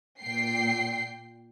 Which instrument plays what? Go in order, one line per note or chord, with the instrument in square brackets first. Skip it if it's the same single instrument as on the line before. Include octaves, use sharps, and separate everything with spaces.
[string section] A#2 G5 C7